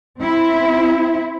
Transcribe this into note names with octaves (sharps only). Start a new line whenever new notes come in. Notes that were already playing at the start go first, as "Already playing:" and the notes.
C4 E4